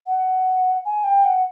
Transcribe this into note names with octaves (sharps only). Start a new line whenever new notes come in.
F#5
G#5
G5
F#5